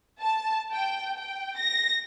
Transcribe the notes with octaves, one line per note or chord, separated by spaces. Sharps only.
A5
G5
G5
A#6